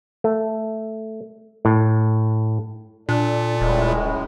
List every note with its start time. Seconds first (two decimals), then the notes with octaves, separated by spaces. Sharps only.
0.24 A3
1.65 A2
3.09 A#2 D4 A4 D5
3.61 D#1 F#2 A2 G#3